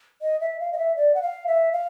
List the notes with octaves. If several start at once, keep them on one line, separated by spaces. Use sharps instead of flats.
D#5
E5
F5
D#5
E5
D5
F#5
F5
E5
F5